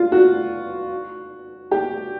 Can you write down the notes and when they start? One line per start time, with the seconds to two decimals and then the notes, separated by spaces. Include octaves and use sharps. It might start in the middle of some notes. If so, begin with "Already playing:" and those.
Already playing: F4
0.12 F#4
1.71 G4